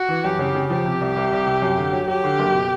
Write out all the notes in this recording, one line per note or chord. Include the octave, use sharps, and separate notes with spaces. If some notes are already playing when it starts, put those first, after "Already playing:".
Already playing: F#4
E3
F#2 G4
C#3
C#3
F3 G4
C3
C2
C2
C2
C3
F#2
D3
F#3
F#3 G4
D3
F#1
B2